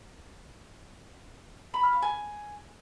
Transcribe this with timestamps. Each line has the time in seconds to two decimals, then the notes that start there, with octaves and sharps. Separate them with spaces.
1.74 B5
1.83 F6
1.93 F5
2.02 G#5